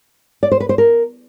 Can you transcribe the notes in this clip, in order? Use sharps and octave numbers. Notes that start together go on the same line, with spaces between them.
D5
C5
B4
C5
A#4